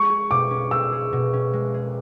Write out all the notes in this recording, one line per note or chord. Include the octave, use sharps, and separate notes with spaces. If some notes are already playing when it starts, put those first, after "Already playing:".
Already playing: G#3 C#6
G#4
B2 D6
C#4
G#3 E6
G#4
B2
C#4
G#3
G#4